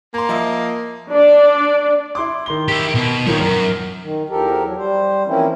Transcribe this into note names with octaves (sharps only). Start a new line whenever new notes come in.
A#3 A#5 C6
F3 D#5 E5
D4 D5
E4 C6 D6
D#3 C6 G7
E4 G4
B2
F2 D#3 F3 C#5
F#2 A#4
D#3
E2 F3 G4 A4 A#4
F#3
G3 C5
E3 F3 A#3 C4 C#4 E4